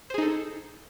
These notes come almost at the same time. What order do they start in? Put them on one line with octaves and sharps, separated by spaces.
C5 G#4 D#4 A4